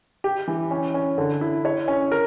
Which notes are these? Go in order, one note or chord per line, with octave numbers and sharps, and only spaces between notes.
G4
E3
C#4
C#4
D3
E4
C#5
C#4
A#4